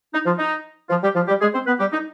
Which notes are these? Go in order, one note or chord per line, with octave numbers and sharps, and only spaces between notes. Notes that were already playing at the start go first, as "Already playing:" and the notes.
D#4
F3 F4
D#4
F3 F4
G3 G4
F3 F4
G3 G4
G#3 G#4
C4 C5
B3 B4
G3 G4
D#4